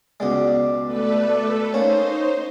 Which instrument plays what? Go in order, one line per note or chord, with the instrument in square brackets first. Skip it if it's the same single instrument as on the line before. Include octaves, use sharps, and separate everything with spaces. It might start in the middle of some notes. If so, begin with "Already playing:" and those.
[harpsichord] C#2 B2 G#3 [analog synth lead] D5
[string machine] A3 A4 B4
[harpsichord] A#3 C#4 [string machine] D#4 C5 [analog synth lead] C#5